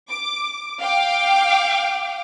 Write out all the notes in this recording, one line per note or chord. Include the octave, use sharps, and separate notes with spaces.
D6
F5 G5 D6